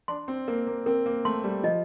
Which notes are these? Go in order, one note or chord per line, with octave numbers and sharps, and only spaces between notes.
D4 C6
C4
A#3 A#4
A#3
C4 A#4
A#3
A3 C6
G3
F3 D#5